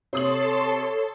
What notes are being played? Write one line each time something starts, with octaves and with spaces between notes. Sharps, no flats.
C3 A4 C#5 A5 C6 D#6 F#7